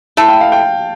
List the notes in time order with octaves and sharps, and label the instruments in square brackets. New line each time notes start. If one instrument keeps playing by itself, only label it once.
[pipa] A3 E4 A4 [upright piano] A5
[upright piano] G5
F5
G5